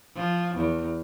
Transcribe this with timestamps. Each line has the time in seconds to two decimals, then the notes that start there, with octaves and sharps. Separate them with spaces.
0.15 F3
0.55 E2